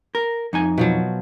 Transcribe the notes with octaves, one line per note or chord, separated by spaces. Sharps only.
A#4
F2 D#4 G#5
B2 F3 F#3